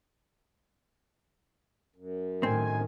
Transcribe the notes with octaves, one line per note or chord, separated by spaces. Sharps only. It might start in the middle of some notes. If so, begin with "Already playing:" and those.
F#2
A2 D#3 C4 G#5